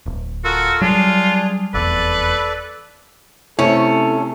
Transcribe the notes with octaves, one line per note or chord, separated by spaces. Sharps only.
D1
F4 F#4 A4 A#4
F#3 G3 D4 F4 G#4
F1 E2 A4 B4 D5
C3 A3 C#4 E4 A4